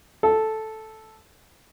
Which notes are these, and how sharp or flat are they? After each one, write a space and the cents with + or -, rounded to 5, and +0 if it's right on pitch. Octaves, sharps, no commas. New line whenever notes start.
A4 -5